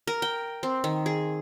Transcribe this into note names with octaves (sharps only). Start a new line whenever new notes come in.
A#4
G5
C4
D#3
G#4